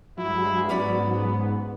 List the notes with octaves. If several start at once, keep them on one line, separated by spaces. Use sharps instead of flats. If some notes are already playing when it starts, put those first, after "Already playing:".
G2 F#3 G#3 E4
G#2 B3 C#4 D5 B5